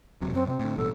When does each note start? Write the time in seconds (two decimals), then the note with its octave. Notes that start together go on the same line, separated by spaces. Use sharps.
0.21 E1 C3 F#3
0.34 F#2 C4
0.47 C3 C4
0.59 A2 D3
0.77 A1 G2 B2 A4